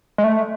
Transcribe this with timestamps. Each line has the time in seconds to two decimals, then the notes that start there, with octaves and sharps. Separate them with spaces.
0.18 G#3
0.24 A3